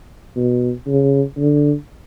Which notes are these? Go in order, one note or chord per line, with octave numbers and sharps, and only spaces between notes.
B2
C#3
D3